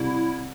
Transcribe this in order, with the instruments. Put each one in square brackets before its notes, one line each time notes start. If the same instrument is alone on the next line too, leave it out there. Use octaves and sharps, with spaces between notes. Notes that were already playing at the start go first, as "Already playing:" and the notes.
Already playing: [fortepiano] C2 [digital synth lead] E4